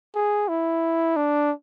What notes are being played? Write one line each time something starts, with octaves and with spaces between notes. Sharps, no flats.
G#4
E4
D4